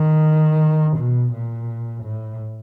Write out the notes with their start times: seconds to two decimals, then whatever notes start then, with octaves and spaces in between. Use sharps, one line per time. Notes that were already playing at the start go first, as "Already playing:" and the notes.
Already playing: D#3
0.97 B2
1.33 A#2
2.04 A2